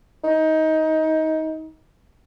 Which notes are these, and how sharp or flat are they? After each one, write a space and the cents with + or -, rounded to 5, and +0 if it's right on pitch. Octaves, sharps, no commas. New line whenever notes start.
D#4 +20